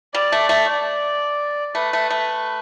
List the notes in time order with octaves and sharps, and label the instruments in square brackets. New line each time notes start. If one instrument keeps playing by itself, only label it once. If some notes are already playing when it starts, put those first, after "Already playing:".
[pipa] G3 [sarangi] D5
[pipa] A3
A3
[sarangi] D5
[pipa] A3 [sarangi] B4
[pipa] A3
A3